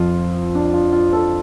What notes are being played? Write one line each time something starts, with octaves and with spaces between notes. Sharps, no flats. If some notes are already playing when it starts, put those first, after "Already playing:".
Already playing: F2 F3 F4
D4
F4
F4
A4